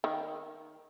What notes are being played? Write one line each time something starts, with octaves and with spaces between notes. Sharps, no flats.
D#3